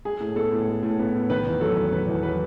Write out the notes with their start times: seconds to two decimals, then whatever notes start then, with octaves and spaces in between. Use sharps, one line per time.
0.05 G#3 G#4
0.20 A2
0.35 B3 A4
0.51 A2
0.67 G#3
0.83 A2
0.99 B3
1.15 A2
1.30 D#3 B4
1.46 E2
1.60 F#3 A4
1.76 E2
1.92 D#3 B4
2.07 E2
2.23 F#3 B4